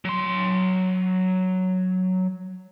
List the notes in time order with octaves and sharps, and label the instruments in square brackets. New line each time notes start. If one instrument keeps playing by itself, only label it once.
[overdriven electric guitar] F#3 C6